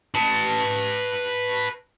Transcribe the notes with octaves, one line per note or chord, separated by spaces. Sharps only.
B4 A5